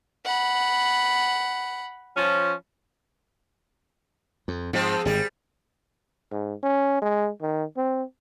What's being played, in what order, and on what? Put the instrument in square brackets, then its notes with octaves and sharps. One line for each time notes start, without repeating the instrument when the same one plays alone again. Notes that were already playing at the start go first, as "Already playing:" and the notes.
[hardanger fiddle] F#5 B5
[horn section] F3 C#4
[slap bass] F2
[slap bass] G#2 [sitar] F3 G#3 C4
[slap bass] G#1 G#2 [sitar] G3 G#4
[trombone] G#2
C#4
G#3
D#3
C4